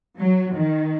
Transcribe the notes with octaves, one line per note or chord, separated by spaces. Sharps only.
F#3
D#3